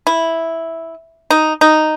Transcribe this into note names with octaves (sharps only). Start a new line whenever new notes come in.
E4
D#4
D#4